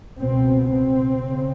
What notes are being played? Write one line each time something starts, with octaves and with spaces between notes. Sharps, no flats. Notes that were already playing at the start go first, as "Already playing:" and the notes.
C#2 B2 C4
C4
C#3